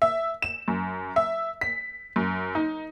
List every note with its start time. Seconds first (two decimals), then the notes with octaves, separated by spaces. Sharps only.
0.02 E5
0.42 E7
0.68 F#2
1.16 E5
1.61 B6
2.16 F#2
2.55 D#4